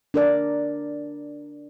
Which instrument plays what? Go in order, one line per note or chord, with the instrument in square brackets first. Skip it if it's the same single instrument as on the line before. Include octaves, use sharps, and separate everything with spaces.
[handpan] D4 A#4 D5